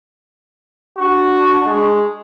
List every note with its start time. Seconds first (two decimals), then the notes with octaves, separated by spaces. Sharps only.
0.98 D4 F#4 C#6
1.66 G#3